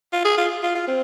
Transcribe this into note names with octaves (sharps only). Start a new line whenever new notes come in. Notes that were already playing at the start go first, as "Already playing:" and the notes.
F4
G#4
F4
F4
F4
C4